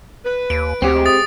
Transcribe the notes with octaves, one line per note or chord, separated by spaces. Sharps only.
B4
D#2 D7
D2 C4 F#4 G4 C#5
G#3
D#6 A6